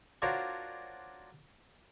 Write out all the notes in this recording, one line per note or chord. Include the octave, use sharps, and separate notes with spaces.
D4 F4 F#4 A#4 C5 C#5